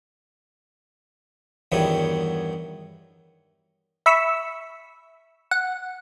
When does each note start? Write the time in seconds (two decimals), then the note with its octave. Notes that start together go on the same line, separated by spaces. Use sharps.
1.72 E2 G2 D#3 F#3 B3
4.06 E5 B5 C#6 E6
5.51 F#5